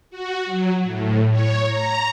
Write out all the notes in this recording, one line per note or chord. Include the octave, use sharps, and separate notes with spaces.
F#4
F#3
A2
C#5
A#5